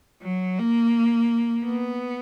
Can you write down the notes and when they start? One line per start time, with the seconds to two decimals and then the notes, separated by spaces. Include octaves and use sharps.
0.22 F#3
0.59 A#3
1.65 B3